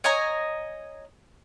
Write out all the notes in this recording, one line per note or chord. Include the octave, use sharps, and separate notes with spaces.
C#5 D#5 G#5 A#5